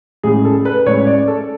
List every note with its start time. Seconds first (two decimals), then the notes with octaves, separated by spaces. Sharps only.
0.23 A2 G#3 C#4 G#4
0.45 A4
0.65 B4
0.86 A2 G#3 C#4 C#5
1.07 D5
1.28 A4